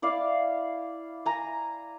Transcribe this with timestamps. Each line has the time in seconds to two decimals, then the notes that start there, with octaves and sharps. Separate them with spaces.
0.02 E4 D5 F5
1.26 G#5 A#5